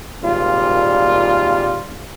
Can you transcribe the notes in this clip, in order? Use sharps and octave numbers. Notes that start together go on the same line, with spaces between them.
G#1 A#2 G3 F4